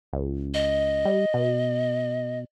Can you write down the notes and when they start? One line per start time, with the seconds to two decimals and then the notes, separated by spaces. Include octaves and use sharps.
0.13 C#2
0.54 D#5
1.05 G3
1.34 B2